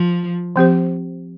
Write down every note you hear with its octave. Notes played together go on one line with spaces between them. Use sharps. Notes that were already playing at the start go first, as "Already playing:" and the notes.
Already playing: F3
F3 C4 G4 C5